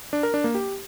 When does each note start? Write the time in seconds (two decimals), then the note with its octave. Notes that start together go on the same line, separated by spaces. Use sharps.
0.13 D4
0.23 A#4
0.34 D4
0.44 A#3
0.55 G4